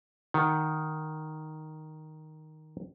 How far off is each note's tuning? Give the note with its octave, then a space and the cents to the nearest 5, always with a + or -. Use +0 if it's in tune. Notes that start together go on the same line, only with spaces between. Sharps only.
D#3 +0 F#5 +0